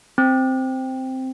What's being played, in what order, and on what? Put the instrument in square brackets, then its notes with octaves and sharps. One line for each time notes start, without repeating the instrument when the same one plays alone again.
[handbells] C4